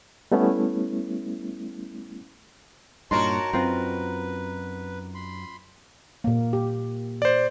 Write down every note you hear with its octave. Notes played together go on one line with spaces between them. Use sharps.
G3 A3 B3 C#4 E4
G2 A#2 D#4 F#4 A#4 C#5 A5 C6
F#2 C4 F4 B4
B5 C6
A#2 A#3
G4
C5 D5